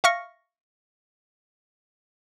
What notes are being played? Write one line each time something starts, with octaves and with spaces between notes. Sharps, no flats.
E5 F5 C#6 F6 A#6 C#7